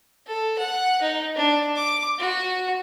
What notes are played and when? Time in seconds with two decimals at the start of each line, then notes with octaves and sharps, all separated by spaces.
0.27 A4
0.58 F#5
1.02 D#4
1.36 D4
1.76 D6
2.19 F#4